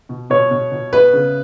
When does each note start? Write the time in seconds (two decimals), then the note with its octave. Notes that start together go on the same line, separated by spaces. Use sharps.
0.09 B2
0.30 B2 C#5
0.51 B2
0.72 B2
0.93 B3 B4
1.13 C#3